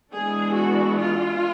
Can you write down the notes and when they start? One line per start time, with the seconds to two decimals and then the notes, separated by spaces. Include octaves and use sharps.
0.12 E3 G#3 B3 D4 G#4
0.54 F#4
0.98 F4